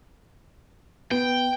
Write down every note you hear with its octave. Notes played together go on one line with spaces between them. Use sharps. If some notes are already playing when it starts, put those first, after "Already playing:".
B3 G5